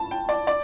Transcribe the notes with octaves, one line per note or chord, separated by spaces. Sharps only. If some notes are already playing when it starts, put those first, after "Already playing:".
Already playing: A5
G5
D5
D5